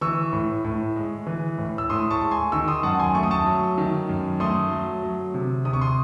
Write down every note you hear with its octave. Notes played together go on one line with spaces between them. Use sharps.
E3 C#6 E6
A2
A2
G#3
E3
A2
E6
A2 C6 D#6
A5 C#6
G#3
G#5 C6
D#3 C#6 E6
C6 D#6
F#2 F#5 A5
G#5 C6
A3 C#6
D#6
A5 C#6
F#3
D#3
F#2
A3 C6 D#6
F#3
F#3
C3
C3 D#6
C#6
C6 D#6